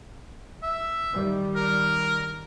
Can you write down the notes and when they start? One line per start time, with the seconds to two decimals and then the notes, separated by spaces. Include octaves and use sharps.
0.63 E5
1.13 D#3 G3
1.56 A#4